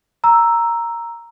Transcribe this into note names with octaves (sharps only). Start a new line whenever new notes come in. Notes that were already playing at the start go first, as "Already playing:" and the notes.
A#5 E6